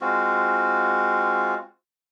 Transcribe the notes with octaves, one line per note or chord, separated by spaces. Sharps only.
G#3 C4 F4 F#4